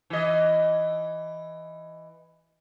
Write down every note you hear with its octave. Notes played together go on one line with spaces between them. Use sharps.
E3 D#5